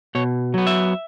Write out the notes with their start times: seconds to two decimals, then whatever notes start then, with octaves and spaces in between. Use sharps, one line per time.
0.15 B2 C#5
0.54 F#3 B3
0.67 E5